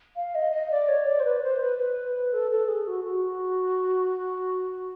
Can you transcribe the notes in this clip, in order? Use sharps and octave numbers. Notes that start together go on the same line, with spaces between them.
F5
D#5
D#5
D5
C#5
D5
C5
B4
C5
B4
A4
A4
G#4
F#4
F#4